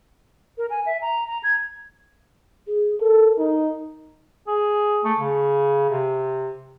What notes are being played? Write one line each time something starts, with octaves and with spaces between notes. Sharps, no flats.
A#4
G#5
E5
A#5
A#5
G#6
G#4
A4 A#4
D#4
G#4
A3
C#3
C3